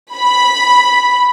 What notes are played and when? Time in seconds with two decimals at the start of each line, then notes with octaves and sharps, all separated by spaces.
0.14 B5